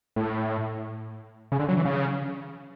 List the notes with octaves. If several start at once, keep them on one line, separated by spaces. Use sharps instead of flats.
A2
C#3
D3
F#3
E3
C#3